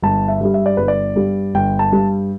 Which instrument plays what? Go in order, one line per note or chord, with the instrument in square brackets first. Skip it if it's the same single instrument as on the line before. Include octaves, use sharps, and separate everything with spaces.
[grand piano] G1 A5
E5
G2 G3
E5
D5
G1 B4
D5
G2 G3
G1 G5
A5
G2 G3